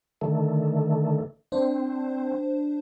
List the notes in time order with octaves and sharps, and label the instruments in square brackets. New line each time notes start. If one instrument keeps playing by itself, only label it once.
[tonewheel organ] D3 D#3 A3
[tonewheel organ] C4 [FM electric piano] D4 C5